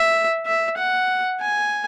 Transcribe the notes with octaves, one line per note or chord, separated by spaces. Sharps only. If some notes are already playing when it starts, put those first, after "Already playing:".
Already playing: E5
E5
F#5
G#5